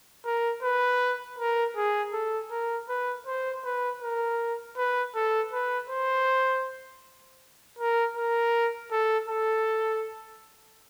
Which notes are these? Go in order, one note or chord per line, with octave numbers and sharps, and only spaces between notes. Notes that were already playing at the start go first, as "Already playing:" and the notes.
A#4
B4
A#4
G#4
A4
A#4
B4
C5
B4
A#4
B4
A4
B4
C5
A#4
A#4
A4
A4